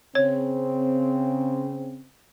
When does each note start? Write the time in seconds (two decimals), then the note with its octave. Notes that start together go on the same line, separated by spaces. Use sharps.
0.15 C#3 C4 C#5